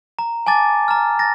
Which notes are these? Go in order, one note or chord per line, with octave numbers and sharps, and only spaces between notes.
A#5
G#5 A5 D6 A6
A#5 F6
A6 A#6